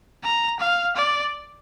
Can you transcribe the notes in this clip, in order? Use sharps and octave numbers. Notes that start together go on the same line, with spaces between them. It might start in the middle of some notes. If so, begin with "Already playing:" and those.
A#5
F5
D5